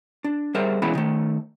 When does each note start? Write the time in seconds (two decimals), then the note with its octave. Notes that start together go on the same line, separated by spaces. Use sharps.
0.24 D4
0.55 G3 G#4 A#4 C5 E5
0.82 B2 E3 G#3 C#4 E4 B5
0.95 D#3 A3